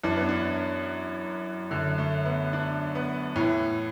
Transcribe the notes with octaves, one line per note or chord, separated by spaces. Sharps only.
F#2 E3 D4
B3
D4
F#2 D3 A3
A3
B3
D4
B3
A2
E3